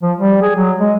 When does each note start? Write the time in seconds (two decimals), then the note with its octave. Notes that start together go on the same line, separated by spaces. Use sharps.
0.03 F3
0.17 G3
0.42 G#4
0.56 F#3
0.80 G#3